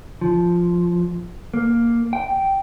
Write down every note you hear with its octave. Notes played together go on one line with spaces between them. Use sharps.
F3
A#3
G5